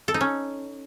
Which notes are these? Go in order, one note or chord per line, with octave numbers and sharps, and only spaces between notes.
A4
D#4
C#4